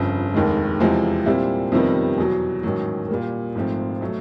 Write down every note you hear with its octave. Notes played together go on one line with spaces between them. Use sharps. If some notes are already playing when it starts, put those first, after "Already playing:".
Already playing: G1 F2 C#3
F1 D#2 D#3 G#3
E2 C3 F3 G#3 C4
A#2 G3 C4 E4
F2 C3 D#3 G3 B3
E2 B2 F#3
A1 G#2 D#3 F#3
A#2 G3 A#3
G#1 G#2 F3 A3 C4
B2 F#3 A3